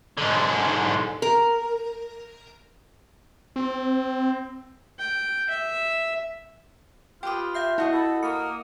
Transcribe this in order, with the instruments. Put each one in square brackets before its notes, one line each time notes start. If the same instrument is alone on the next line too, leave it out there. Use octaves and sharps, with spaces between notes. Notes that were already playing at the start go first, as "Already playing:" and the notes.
[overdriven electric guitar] G#2 D3
[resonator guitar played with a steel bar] A#4
[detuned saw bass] C4
[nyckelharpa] G5
E5
[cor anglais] F4 [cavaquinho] G4 B4 D#6 [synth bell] G5 D6
[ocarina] E5 [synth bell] F5 G6 C7
[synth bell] E4 [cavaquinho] F#4 D#5 C#6
[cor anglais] A4 [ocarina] B5
[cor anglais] A#3 [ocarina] D#6 [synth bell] C#7